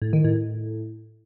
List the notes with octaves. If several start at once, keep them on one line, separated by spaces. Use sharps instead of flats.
A2
D#3
A2
A2